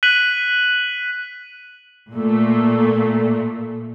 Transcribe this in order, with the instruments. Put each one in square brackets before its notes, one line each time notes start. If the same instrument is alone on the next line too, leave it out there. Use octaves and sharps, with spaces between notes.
[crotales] F#6 B6 D#7 F#7
[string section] A#2 A3